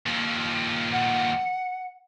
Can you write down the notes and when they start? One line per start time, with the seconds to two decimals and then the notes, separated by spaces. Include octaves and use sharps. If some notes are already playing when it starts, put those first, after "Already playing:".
0.06 D#2 F3
0.92 F#5